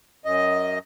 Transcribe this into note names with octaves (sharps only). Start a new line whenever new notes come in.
F#2 D#5